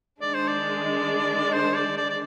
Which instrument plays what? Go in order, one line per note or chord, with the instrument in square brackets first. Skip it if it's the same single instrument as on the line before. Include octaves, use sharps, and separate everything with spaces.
[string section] D#3 G#3 D4 [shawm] D5
[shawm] C5
D5
C5
D5
D5
D5